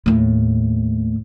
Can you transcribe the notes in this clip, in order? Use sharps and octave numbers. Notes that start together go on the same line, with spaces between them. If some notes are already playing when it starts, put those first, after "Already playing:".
D#2 A2